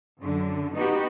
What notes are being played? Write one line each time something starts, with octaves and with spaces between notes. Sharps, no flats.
F#2 D3
B3 D#4 F#4 G4